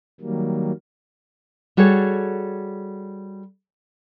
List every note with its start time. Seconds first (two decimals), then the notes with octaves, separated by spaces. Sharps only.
0.21 D#3 F#3 G3 A#3
1.77 G3 F#4 G#4 A4 C#5